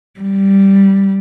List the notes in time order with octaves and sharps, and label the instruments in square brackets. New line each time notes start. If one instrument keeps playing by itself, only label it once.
[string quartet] G3